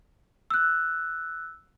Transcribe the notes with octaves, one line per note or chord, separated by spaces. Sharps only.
E6 F#6